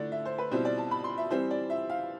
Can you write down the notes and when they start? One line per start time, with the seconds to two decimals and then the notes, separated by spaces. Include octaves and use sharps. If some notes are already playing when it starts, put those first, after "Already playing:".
Already playing: D3 A3 E4 D5
0.12 E5
0.25 C5
0.38 B4
0.51 B2 G3 C4 E4 C5
0.65 D5
0.78 A5
0.91 B5
1.04 C6
1.18 E5
1.30 E3 G3 C4 C5
1.51 D5
1.70 E5
1.90 F5